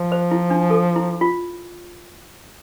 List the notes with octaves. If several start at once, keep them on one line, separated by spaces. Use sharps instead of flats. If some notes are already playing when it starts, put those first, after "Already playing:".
Already playing: F3
C5
E4
D4
A4
E4
F4